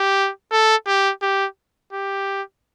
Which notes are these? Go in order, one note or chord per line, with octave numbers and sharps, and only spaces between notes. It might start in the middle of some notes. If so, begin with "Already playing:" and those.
Already playing: G4
A4
G4
G4
G4